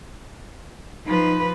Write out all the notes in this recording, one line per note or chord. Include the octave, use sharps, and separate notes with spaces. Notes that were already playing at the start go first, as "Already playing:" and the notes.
F3 D#4 B4